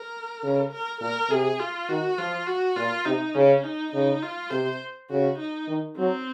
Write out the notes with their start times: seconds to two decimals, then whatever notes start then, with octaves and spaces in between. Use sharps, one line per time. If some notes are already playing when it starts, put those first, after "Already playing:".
Already playing: A#4
0.44 C#3
0.72 A#4
1.01 A#2 A#4
1.30 C3 G#4
1.60 F4
1.89 D#3 F#4
2.18 F3 F4
2.47 F#4
2.76 A#2 F4
3.05 C3 D#4
3.35 C#3 C#4
3.64 D#4
3.93 C#3 D#4
4.23 F4
4.51 C3 C5
5.09 C#3 F#4
5.39 D#4
5.68 D#3
5.98 F#3 C4